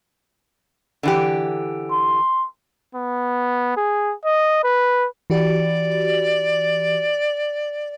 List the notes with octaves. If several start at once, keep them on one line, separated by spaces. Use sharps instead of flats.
D3 E3 G4
C6
B3
G#4
D#5
B4
E3 F#4 G4 D5